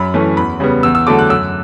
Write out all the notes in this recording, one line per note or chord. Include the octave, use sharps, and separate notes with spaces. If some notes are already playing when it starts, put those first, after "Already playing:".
Already playing: F#2 B5
E3 A3 C#4
E2 B5
C#3 G3 B3
E2 E6
E6
D3 F#3 A3 D6
F#6
F#2 E6